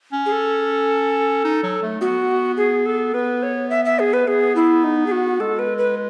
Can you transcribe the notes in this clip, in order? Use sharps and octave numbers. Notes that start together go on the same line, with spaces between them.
C#4
G#4
A4
D#4
F#3
A3
B3 F#4
G#4
A4
B3 B4
C#5
E5
E5
G#4
B4
B3 G#4
E4
D#4
G#4
F#4
G#3 A4
B4
B4